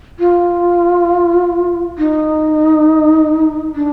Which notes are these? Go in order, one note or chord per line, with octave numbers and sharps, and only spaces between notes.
F4
D#4
D4